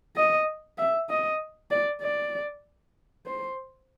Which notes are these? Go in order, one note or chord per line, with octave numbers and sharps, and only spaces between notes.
D#5
E5
D#5
D5
D5
C5